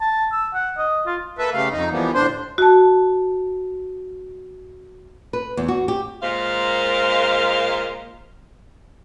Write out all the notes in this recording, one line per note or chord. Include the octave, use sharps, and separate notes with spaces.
A5
E6
F#5
D#5
F4
A#3 A4 B4 E5
C#3 G3 A3 F5
F2 D#4
E3 F3 G3 A#3 B3
D2 A2 D4 C5 C6
F#4 A5
B4
E2
F#4
G4
A#2 G#3 A#4 C5 F5